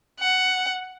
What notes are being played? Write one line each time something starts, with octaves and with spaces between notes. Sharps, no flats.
F#5